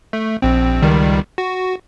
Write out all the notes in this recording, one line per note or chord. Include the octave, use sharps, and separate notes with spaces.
A3
A#1 C4
C#2 D#3 G3
F#4